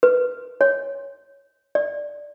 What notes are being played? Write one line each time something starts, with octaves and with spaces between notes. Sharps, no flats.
B4
C#5
D5